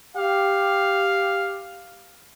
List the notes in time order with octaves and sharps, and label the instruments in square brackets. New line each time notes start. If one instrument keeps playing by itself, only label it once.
[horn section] G4 F5